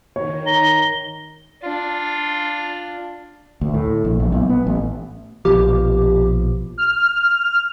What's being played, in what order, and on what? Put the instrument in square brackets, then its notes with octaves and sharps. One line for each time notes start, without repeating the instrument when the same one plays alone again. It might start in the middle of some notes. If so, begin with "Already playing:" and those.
[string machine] D#3 [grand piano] C#5
[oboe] A#5 [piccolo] G7
[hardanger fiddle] D4 [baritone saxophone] F4
[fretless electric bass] D2
A2
A#1
A#1
B1
B3
A1
[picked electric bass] A#1 B2 F3 [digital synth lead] G4
[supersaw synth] F6